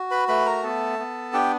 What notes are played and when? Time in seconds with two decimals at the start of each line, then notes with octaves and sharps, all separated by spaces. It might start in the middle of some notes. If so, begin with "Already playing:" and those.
Already playing: F#4
0.11 B4 B5
0.28 A3 B4 B5
0.46 A#4 A#5
0.63 B3 A4 A5
0.99 B3
1.33 D4 G4 G5